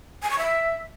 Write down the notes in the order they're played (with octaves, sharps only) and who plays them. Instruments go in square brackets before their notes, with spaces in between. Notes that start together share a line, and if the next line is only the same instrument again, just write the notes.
[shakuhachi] G#5
C#6
E5